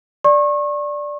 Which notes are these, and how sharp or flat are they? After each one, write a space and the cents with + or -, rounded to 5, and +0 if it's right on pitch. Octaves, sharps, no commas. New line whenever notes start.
D5 +0 C#6 -35